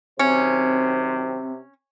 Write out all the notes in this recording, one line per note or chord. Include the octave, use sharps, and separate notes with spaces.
C3 D#3 F#3 C4 C#4 C5